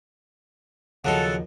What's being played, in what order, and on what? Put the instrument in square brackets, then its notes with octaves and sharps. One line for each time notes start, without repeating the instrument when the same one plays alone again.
[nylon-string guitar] D#2 F3 D#5 [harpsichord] C#3 F#3 C6 [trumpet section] A4 [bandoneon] F#5